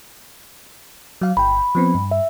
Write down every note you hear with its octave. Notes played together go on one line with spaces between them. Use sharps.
F#3 F5
G1 G5 B5
F3 B3 C4
G2
E5